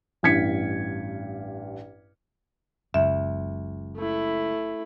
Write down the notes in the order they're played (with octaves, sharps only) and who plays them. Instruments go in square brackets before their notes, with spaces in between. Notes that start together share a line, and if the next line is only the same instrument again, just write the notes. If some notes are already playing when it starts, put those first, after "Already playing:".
[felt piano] A1 G2 G#6 B6 C#7
[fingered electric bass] F#1 F#2 [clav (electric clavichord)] C#2 [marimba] E5
[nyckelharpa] A3 E4